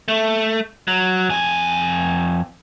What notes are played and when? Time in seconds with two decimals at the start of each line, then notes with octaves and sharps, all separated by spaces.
0.08 A3
0.88 F#3
1.30 F2 G#5